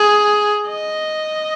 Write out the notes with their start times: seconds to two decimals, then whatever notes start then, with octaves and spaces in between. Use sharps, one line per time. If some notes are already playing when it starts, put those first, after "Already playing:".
Already playing: G#4
0.69 D#5